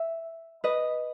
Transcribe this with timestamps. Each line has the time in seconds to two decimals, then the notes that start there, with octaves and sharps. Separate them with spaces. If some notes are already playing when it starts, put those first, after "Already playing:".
Already playing: E5
0.64 B4 D#5